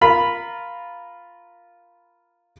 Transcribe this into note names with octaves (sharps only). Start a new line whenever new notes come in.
F4 A#4 B5